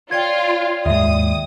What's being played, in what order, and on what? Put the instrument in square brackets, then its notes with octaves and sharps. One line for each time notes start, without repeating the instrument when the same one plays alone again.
[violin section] F4 [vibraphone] C#5 D5 G5 [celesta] G#6
[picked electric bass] D#2 G#2 [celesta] E5 [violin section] D#6